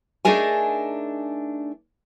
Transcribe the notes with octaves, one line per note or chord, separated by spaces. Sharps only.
A3 D4 D#4 G#4 A#4 G#5